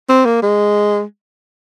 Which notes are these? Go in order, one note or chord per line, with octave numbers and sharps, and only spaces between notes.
C4
A#3
G#3